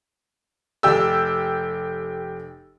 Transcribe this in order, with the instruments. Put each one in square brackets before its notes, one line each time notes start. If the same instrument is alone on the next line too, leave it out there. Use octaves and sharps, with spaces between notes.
[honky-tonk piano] F1 G4 E6 [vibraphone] A4